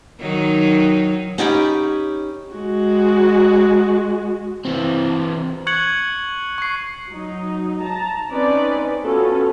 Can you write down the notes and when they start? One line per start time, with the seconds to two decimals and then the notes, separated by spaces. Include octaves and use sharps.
0.21 D#3 F#3 D#4
1.38 C#4 D#4 G4 B5
2.53 G#3 F#4
4.65 E3 C4
5.67 C#6 F#6 G#6 C#7 F#7
6.58 C#6 C7
7.11 F#3 D#4
7.81 A5 A#5
8.30 C4 C#4 D#4 B4 D5
9.02 B3 C#4 F4 F#4 A4